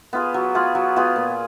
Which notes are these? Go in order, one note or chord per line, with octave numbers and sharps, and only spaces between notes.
B3 F4 G#4
F#3
B3 F4 G#4
F#3
B3 F4 G#4
A#2